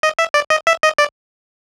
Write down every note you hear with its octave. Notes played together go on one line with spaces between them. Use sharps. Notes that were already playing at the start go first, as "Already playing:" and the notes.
D#5
E5
D5
D#5
E5
D#5
D5